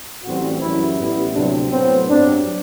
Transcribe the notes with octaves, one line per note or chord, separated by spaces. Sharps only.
A1 A2 E3 G3 C4 F#4
F#2 E3 G3 E4
A1 A2 G3 B3 E4
D2 C3 F#3 C4 D4
A2 F#3 B3 C4
G2 F#3 C4 D4